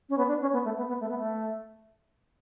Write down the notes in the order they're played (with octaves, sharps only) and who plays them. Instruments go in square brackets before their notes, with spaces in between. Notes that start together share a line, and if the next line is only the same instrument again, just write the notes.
[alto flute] C#4
B3
D4
C#4
B3
A3
B3
B3
A3
B3
A3